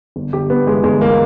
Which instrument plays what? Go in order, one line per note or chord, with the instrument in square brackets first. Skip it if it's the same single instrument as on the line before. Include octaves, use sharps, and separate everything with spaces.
[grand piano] G1
G1 G4
G2 B3
E3 G#3
G1 G#3
A#3